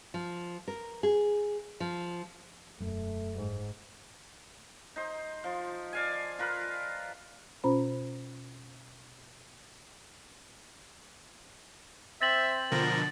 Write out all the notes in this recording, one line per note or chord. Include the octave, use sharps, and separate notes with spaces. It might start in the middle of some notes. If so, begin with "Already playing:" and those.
F3
A#4
G#4
F3
E1 F#2 A3
G#2
D#4 C5
F3
D5 F5 G#5
F4 A#4 B4
B2 C#4 F4 C5 A#5 B5
C4 C5 E5 A6 A#6 F#7
B2 D3 F3 A#4